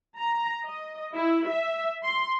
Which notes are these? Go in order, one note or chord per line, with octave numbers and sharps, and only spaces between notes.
A#5
D#5
E4
E5
C6